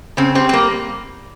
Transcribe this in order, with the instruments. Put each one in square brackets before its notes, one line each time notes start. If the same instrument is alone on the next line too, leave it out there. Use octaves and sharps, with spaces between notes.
[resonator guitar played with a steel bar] C#3 C4
G3 C4
C4
G3 A#3